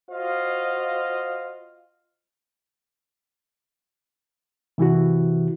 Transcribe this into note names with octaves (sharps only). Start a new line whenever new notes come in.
F4 F#4 C5 D#5 F5
C3 E3 E4 F#4